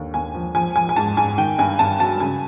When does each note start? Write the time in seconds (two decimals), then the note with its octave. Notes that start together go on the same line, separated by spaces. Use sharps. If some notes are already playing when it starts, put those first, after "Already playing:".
Already playing: D#2 D3
0.14 D#2 G#5
0.34 F3
0.55 F3 G#5
0.76 F3 G#5
0.89 G#5
0.96 G#2 A5
1.17 G#2 G#5
1.38 D#3 G5
1.58 G2 G#5
1.79 G2 A5
1.99 F#3 A5
2.20 C#3 G#5